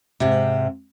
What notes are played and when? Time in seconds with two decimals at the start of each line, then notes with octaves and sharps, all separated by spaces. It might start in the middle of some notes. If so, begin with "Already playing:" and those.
0.20 G#2 C3